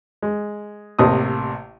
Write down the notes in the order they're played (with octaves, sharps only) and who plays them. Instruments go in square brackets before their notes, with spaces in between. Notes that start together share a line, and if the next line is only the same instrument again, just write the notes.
[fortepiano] G#3
A1 C3 A#3 D#6